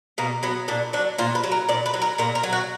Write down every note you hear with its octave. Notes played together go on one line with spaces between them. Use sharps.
B2 A#3
F#3 B3
A#2 D4
F#3 D4
A#2 F4
B4
F#3
A#4
A#2 D5
B4
F#3
A#4
A#2 A#4
A#4
F#3
F#4